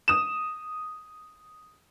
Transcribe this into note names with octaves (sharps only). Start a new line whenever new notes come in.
D#6 E7